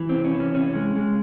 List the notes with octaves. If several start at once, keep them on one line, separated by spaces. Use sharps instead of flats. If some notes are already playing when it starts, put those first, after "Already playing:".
Already playing: E3
C3 C4
C#4
E3
C#4
C3 C#4
G#3
G#3